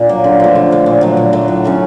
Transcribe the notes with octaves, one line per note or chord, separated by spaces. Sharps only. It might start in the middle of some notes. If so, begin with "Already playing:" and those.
Already playing: A#2 D4
F#3 A#3
D3
F3 A3
D3
F3 A3
A#2
F#3 A3
A#2
F#3 A3
A2
F#3 A3 C#4